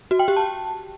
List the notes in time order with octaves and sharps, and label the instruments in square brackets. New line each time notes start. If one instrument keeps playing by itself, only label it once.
[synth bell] F#4
G5
G4
A5